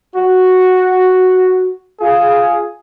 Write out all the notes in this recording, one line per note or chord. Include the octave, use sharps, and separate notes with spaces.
F#4
F4 G#4